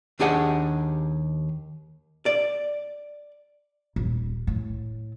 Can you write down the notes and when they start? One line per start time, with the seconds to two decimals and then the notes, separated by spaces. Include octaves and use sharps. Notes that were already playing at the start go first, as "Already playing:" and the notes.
0.19 D#2 D4 G4 G#4 D#5 F#5
2.26 D5
3.96 D#1
4.47 A2